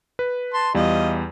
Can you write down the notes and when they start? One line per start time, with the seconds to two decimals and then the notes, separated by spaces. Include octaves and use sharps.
0.19 B4
0.54 A5 C6
0.74 E2 G3 F4 D#5